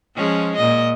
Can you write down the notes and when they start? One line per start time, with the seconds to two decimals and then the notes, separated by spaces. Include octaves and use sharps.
0.15 F3 G#3 C#4
0.56 A#2 D#5